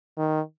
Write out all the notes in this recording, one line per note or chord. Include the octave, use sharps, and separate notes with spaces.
D#3